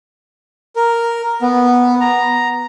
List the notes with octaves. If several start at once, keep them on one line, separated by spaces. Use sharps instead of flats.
A#4
B3
A#5